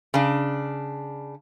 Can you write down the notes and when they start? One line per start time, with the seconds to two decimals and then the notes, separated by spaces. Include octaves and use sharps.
0.14 C#3 D4